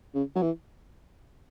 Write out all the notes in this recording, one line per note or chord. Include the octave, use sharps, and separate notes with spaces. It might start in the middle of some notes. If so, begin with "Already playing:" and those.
C#3
F#3
E3